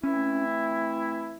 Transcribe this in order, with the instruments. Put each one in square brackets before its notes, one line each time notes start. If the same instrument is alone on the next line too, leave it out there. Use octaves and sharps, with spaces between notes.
[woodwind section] E3 A3 C4 E4 [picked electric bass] C#4